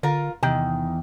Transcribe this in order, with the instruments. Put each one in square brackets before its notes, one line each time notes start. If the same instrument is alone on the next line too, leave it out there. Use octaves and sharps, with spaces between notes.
[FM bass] D3 [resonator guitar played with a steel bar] F4 A#4
[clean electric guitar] E2 G5 [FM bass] C3 [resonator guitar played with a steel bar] D#3